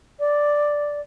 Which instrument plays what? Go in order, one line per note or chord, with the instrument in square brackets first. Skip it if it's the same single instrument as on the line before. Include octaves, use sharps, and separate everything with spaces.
[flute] D5